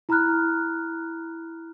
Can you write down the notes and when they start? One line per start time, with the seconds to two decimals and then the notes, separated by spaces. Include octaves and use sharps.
0.09 E4 A#5 B5 F6 F#6